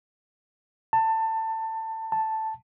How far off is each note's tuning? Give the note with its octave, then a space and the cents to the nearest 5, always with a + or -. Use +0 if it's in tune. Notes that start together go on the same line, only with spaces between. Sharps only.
A5 +20
A5 +0